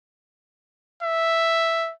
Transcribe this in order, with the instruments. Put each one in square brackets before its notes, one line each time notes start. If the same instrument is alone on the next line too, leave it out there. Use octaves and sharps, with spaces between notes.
[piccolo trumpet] E5